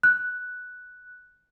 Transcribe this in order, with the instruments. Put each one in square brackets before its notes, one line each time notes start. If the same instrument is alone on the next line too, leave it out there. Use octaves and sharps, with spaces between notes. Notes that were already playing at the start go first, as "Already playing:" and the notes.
[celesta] F#6